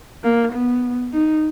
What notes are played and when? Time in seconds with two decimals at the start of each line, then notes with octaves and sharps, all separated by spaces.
0.23 A#3
0.53 B3
1.13 D#4